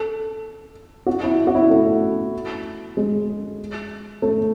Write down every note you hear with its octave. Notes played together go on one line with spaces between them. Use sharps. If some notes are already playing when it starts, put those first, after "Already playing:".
Already playing: A4
F#4
E4
F#4
E4
A3
G#3
A3